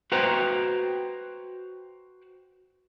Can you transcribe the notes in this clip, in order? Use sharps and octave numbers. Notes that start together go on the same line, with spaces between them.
F#4 B4 C5 G5 A#5